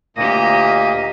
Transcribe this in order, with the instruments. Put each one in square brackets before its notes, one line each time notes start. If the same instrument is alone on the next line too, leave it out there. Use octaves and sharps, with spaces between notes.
[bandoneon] D2 A#2 A#3 [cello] G4 D#5